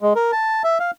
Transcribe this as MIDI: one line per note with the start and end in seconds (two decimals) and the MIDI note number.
0.02 0.13 56
0.16 0.31 70
0.32 0.62 81
0.64 0.78 76
0.80 0.91 77